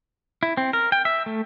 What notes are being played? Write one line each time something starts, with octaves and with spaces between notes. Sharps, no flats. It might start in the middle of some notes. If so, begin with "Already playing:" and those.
E4
C4
A#4
G5
E5
A3